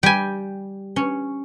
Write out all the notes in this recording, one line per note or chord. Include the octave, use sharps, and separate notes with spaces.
G3 G5 G#5
C#4